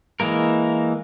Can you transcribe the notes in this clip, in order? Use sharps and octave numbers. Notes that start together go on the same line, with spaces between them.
E3 G#3 A#3 A#4